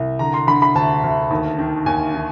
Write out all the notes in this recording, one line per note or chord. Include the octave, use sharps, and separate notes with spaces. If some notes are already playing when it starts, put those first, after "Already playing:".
Already playing: C2
D3 A#5
C6
D3 B5
B5
D2 A5
D2
D#2
D#3
D#2 G#5
D#3